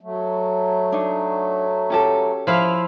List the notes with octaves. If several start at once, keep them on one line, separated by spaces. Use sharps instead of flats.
F#3 A3
D4 D#4
C#4 G4 A4
F3 E4 F5